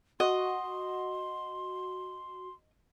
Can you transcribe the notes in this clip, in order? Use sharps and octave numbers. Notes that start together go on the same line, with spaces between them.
F#4 D#5 C6